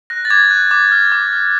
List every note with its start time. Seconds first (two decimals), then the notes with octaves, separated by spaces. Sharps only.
0.10 F#6 A#6
0.25 A6
0.30 D6 G#6
0.51 F#6
0.71 D6
0.92 F6
1.12 D6
1.33 F6